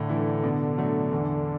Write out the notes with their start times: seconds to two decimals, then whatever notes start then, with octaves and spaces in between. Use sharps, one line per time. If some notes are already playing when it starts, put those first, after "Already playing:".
Already playing: A2 D3
0.09 E3 A3 E4
0.44 B2
0.78 F#3 A3
1.11 E2